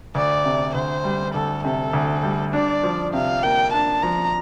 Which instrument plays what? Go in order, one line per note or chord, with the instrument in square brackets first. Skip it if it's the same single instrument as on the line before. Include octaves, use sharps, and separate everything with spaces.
[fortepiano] D2 [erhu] D5
[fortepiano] C3
[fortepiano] D2 [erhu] C5
[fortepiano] G3
[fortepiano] D2 [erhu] A4
[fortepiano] C3 [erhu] A4
[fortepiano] D2
G3
[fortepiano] D4 [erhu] D5
[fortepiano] F3
[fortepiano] C3 [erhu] F5
[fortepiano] A#3 [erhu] G5
[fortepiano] D4 [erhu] A5
[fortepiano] F3 [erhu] A#5